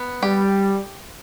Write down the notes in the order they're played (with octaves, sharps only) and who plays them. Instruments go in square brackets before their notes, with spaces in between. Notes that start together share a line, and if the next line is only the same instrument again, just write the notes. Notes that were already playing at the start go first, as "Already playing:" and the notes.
Already playing: [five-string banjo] B3
[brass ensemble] G3 [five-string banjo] G4